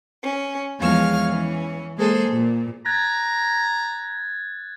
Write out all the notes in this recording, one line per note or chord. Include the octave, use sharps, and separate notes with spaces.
C#4
E2 F3 G#3 C#5 F5 F6
E3 C#4
G#3 A#3 G#4 A4 C5
A#2
A#5 F#6 G#6 A6